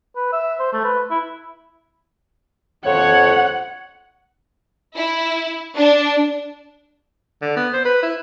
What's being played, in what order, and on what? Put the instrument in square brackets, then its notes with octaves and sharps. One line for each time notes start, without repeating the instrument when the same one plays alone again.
[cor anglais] B4
E5
C5
A3
B4
E4
[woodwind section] F2 C#5 [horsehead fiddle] F#5
[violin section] E4
D4
[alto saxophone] D3
B3
C5
B4
E4